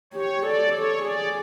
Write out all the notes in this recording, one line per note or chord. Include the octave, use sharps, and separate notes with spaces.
G4 C#5
A4 D5
A4 C#5
G#4 D5